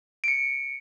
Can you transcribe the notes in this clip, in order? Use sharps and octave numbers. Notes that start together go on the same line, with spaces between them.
C#7 D7